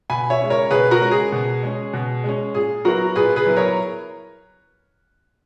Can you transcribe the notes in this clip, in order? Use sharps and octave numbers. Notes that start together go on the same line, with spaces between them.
B2 G#5 B5
C#5 E5
G#3 C#4
A#4 C#5
B2 G#4 B4
F#4 A#4
G#3 C#4
G#4
B2
G#3 C#4
B2
G#3 C#4
A#2 G#4
F#3 B3 E4 F#4 A#4
A#2 G#4 B4
G#4 B4
F#3 B3 E4
A#4 C#5